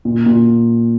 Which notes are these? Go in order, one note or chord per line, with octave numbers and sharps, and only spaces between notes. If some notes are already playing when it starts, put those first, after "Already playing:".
A#2
A#2